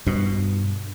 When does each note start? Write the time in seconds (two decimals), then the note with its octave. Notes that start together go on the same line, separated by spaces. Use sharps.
0.06 G2 B2